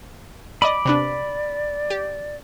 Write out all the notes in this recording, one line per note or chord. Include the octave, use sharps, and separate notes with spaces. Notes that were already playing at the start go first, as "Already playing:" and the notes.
D5 D#5 B5 D6
C3 B3 D4 D5
G4